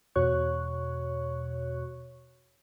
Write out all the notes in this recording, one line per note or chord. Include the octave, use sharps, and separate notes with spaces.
E2 B2 F#4 C#5 C#6 F#6